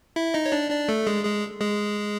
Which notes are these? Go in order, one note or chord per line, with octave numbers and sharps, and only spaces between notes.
E4 E5
D#4 D#5
C#5
D4 D5
D4 D5
A3 A4
G#3 G#4
G#3 G#4
G#3 G#4